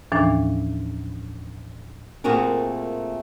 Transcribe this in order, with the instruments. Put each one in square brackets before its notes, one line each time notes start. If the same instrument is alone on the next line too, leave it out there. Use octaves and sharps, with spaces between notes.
[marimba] D#2 A2 E3 F3 C#4 D4
[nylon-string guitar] A#2 A3 C4 F#4 G#4 A#4